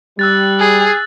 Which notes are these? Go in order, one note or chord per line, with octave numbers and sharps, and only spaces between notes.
G3 E6 F#6 A6
G#4